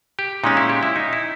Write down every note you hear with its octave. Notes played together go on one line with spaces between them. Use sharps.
G4
A#2 G#3 C#4 D#4
E4
G4
E4
D#4
E4